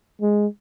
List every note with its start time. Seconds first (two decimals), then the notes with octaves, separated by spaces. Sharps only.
0.22 G#3